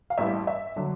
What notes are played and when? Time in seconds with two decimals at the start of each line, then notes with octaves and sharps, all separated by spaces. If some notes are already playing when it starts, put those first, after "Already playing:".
0.10 F5
0.18 A1 G2 E3 G3 E5
0.47 E5
0.76 D3 F#3